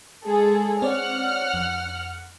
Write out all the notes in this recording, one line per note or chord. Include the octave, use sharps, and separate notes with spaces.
G#3 G#4 A4
C4 C#5 D5 F#5 F6
F2